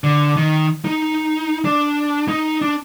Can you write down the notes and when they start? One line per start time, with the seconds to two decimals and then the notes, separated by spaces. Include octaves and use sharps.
0.04 D3
0.37 D#3
0.85 D#4
1.65 D4
2.28 D#4
2.62 D4